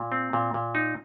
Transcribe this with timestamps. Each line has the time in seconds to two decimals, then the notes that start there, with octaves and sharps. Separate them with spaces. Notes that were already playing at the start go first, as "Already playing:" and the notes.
Already playing: A#2
0.12 C4
0.33 A#2
0.54 A#2
0.75 D#4